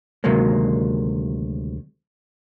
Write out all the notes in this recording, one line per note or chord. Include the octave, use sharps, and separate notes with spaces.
D2 C3 D#3 F#3 G#3 A#3